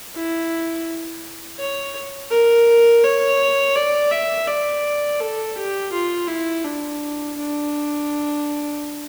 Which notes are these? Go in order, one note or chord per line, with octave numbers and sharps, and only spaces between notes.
E4
C#5
A#4
C#5
D5
E5
D5
A4
G4
F4
E4
D4
D4